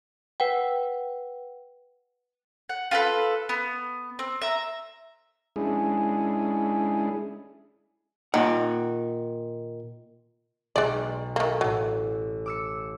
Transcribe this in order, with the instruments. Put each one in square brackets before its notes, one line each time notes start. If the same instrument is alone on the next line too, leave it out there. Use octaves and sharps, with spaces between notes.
[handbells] B4 F#5 G5
[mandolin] F#5
F4 G4 A4 B4
B3
C4
E5 A#5
[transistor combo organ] G#3 C#4 D4 E4 G#4
[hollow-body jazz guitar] A#2 F#5 [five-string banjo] D#3
[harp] B1 [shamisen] G#3 D5
[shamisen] D#3 A#3 [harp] A4
[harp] A1 [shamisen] F#3
[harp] D6 E6 C#7